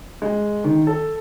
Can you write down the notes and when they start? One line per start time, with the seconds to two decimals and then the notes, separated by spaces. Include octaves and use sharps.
0.22 G#3
0.64 D#3
0.87 A4